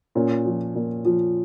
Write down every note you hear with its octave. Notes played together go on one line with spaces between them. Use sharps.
A#2 C#4
F3
A#2
F3